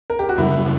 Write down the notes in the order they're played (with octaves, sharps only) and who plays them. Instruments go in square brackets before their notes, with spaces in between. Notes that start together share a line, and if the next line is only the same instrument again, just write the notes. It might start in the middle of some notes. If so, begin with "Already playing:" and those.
[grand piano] A#4
G4
F#4
[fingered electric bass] F#2 C#3 G3 [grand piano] E4